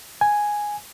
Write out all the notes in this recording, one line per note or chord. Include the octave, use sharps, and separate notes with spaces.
G#5